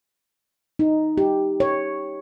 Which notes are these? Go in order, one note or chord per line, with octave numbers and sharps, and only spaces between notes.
D#4
G4
C#5